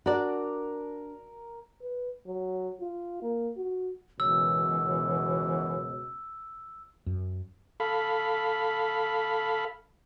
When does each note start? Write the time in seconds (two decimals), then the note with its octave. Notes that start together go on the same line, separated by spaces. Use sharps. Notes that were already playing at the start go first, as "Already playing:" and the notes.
0.06 D4 F#4 A#4 D5
1.83 B4
2.27 F#3
2.81 F4
3.23 A#3
3.57 F#4
4.20 C#2 F#2 B2 E3 C#5 E6
7.06 F#2
7.80 A4 F5 B5